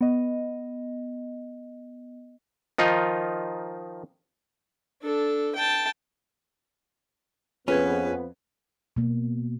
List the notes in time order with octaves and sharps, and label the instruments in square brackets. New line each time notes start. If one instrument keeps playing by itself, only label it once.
[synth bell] B3 D#5
[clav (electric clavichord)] D#3 F3 D#4 F4
[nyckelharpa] D4 A4
G5 A5
[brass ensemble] F2 B3 [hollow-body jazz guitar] C#4 [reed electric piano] F4 G#4 G#6 [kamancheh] B4
[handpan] B2 A#3